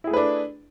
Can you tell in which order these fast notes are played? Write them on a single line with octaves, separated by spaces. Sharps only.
E4 G#4 A3 B4 D4